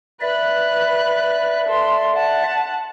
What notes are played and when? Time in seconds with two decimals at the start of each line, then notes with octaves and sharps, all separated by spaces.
0.21 B4 D5 E5 F#6
1.66 A4 C6
2.15 F#5 A5